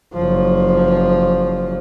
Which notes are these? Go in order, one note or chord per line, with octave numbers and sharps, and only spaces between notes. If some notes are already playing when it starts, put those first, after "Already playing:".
F#1 F3